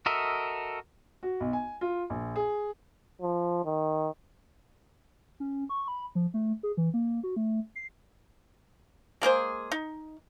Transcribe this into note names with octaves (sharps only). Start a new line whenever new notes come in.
F#4 A4 A#4 D#5 E5
F#4
B1
G#5
F4
A#1
G#4
F3
D#3
C#4
C#6
B5
F3
A3
G#4
E3
A#3
F#4
A3
C7
G#3 A#3 G#4 C5
D#4